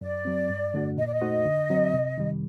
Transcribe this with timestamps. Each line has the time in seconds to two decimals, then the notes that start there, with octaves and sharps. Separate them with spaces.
0.01 F#2 D5
0.25 F#3 C4
0.50 G2
0.74 D3 A3 D4 F#4
0.98 A#2 D#5
1.06 D5
1.13 D#5
1.21 A3 D#4 F#4 C5
1.45 D3
1.70 F#3 C4
1.93 C3
2.18 D#3 G3